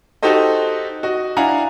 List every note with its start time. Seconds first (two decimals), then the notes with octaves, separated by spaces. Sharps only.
0.23 D#4 F#4 G4 A4 C5 D#5
1.03 F#4 D#5
1.37 D4 E4 F5 F#5 G#5 A#5